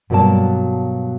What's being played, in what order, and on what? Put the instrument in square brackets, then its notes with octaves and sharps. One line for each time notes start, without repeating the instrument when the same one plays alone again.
[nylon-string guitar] G2 B2 F#3 A#3 D5 A5